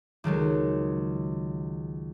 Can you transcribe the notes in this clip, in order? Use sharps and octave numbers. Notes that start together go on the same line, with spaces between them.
C#2 D#3 F#3 G#3